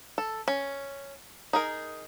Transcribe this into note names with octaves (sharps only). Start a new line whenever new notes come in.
A4
C#4
D#4 G#4 A#4